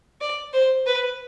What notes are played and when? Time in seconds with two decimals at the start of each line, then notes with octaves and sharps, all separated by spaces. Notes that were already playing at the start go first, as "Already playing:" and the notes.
0.21 D5
0.53 C5
0.86 B4